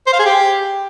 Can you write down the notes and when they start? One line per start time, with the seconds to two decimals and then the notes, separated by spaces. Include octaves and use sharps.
0.07 C5
0.13 F5
0.19 G#4
0.25 G4